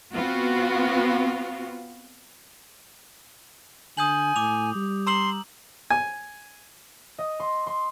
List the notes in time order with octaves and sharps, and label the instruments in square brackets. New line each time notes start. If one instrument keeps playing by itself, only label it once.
[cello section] B3 C4 F4 F#4
[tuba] D3 [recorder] G#5 [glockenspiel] D#6 G6 F#7
[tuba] A2 [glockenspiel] D6 F7
[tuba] G3
[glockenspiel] A#5 E6 F#7 [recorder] C6
[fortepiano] G#5
[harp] D#5
C6
C6